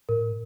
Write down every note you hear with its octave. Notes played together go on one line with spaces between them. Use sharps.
A2 A#4